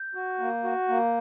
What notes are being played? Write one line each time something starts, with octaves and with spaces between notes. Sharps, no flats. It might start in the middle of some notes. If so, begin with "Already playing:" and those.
Already playing: G6
F#4
A#3
F#4
A#3